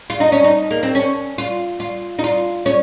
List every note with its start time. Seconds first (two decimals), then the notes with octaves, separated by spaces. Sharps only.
0.10 F4
0.20 D#4
0.32 C#4
0.44 D#4
0.71 A#3
0.83 C4
0.95 C#4
1.38 F4
1.80 F4
2.19 D#4
2.24 F4
2.66 C#4